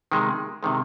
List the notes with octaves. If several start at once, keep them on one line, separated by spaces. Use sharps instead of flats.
C3 D#3 G#3
C3 D#3 G#3